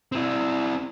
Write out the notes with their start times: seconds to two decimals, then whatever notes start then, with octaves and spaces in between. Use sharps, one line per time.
0.12 C4 E4